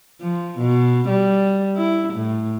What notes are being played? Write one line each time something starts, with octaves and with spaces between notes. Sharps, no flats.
F3
B2
G3
E4
A2